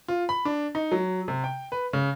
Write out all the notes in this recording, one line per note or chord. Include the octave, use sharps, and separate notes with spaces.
F4
B5
D4
D#4
F#3
C3
G5
B4
C#3